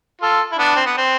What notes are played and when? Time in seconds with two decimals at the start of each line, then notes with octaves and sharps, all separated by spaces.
0.22 F4 A4
0.52 E4
0.58 B3 D4
0.76 C4
0.86 B3
0.97 C4